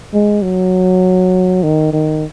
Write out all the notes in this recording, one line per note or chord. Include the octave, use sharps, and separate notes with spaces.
G#3
F#3
D#3
D#3